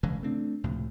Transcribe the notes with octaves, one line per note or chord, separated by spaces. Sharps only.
F1 C#3 E3 G#3
A3 C4 D4
C#2 A2 C3 F3